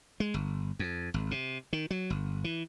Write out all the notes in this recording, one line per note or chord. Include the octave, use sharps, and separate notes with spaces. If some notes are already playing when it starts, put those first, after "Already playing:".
G#3
G1
F2
G#1
C3
D#3
F#3
G1
E3